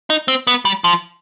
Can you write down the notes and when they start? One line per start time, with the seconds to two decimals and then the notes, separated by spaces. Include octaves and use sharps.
0.10 D#4
0.28 C4
0.47 B3
0.65 G3
0.84 F3